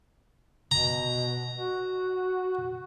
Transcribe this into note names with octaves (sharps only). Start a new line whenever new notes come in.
B2 A#5
F#4